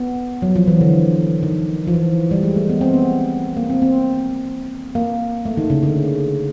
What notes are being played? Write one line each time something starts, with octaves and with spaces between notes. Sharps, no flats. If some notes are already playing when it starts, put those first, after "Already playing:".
Already playing: B3
F#3
F3
E3
D3
D#3
F3
E3
G3
G#3
A3
B3
C4
B3
A#3
C4
C4
A#3
A3
D#3
C#3
D3